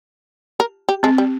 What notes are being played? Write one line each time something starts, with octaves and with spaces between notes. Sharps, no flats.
A#4
G4
G#3 C4
G3